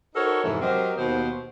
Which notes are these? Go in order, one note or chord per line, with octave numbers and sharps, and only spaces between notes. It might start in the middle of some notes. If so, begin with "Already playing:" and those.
D#4 F#4 A4 A#4 C5 C#5
F2 G#2 C3 E3 G#3 A4
F#3 C4 G4 A#4 C5 D#5
D#2 B2 D#3 C5